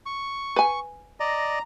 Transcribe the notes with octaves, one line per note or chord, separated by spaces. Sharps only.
C#6
B4 G#5
D5 D#5 A#5